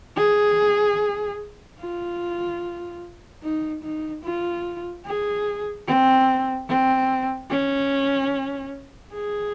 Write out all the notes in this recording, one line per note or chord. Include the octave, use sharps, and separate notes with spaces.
G#4
F4
D#4
D#4
F4
G#4
C4
C4
C#4
G#4